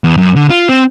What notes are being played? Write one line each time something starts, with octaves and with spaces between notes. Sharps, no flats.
E2
F#2
D3
F4
C4